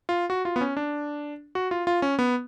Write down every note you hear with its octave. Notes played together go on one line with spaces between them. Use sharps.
F4
F#4
F4
B3
C#4
D4
F#4
F4
F4
C#4
B3